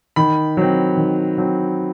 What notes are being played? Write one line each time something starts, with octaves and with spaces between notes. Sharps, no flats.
D#3 B5
F#3 C4
D#3
F#3 C4